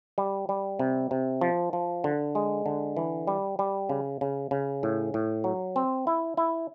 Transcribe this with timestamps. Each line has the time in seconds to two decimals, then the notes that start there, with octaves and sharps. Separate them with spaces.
0.18 G3
0.49 G3
0.79 C3
1.11 C3
1.41 F3
1.73 F3
2.04 D3
2.35 G#3
2.66 D3
2.97 E3
3.27 G3
3.59 G3
3.89 C#3
4.21 C#3
4.51 C#3
4.83 A2
5.14 A2
5.44 F#3
5.76 C4
6.07 E4
6.37 E4